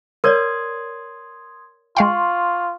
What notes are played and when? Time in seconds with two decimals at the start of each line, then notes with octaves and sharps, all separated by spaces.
0.24 A#4 C#5 D5 C6 D#6 G#6
1.97 G#3 F4 F5 G5 C6 C#6